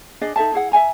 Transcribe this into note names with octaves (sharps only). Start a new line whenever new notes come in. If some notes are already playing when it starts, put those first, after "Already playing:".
D4 G#4 D5 D#5
D#4 A4 E5 A5
E4 G#4 F#5
E5 F#5 G#5 A#5